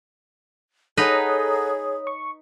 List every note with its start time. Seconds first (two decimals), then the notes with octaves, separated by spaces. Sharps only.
0.97 D#4 G#4 A4 B4 C#5 F#5 A#5 D#6
2.07 C#6